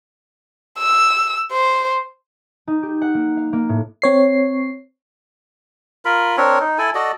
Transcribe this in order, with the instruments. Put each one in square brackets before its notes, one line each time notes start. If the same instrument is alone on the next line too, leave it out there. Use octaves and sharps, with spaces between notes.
[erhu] E6
C5
[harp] D#4
G4
F#5
A#3
F5
A#3
A2
[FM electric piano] C4 C#5 C7
[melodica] F4 A#4 B5
C4 D4 A#4 C#5
D#4
E4 A4 G#5
F#4 A4 D5 D#5